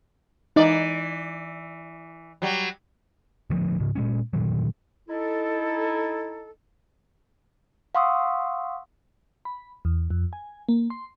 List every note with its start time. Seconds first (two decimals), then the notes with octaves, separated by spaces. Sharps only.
0.56 E3 D#4 D5
2.42 F#3 G3
3.50 D1 D2 F3
3.80 G#2 C#3
3.95 A#2 G#3 C#4
4.33 G2 A#2 D#3 F#3
5.09 D#4 E4 A4
7.95 F5 F#5 C6 C#6 D#6 E6
9.45 B5
9.85 E2
10.10 F2
10.33 G#5
10.69 A#3
10.90 C6